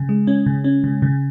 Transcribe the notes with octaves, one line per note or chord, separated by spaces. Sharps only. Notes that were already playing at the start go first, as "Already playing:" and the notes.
Already playing: C#3
G#3
C#4
C#3
C#4
C#3
C#3